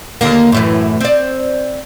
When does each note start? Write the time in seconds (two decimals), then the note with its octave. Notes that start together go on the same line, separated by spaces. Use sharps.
0.21 D#2 D3 A#3
0.52 F#2 A2 E3
1.01 C4 D5